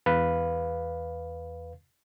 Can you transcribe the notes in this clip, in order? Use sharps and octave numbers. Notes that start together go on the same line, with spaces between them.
E2 B4 F5